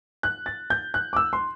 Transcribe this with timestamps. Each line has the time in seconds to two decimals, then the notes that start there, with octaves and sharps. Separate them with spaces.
0.23 F#6
0.46 A6
0.70 G6
0.94 F#6
1.13 D6
1.16 E6
1.33 C6